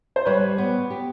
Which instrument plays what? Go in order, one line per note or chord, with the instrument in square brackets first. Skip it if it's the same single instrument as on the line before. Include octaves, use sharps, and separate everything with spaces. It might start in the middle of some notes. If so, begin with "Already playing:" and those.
[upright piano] C5
[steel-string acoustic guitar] G3 [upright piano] B4 C#5
[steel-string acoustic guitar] B3
G4